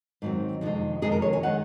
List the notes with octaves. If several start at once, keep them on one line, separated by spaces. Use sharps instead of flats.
G#2 D#3 F#3 C4
F2 C3 D#3 G#3 D#4
F2 C3 D#3 G#3 D#4 G#4
A#4
C#5
G#5
D#3 G#3 D#4 F#5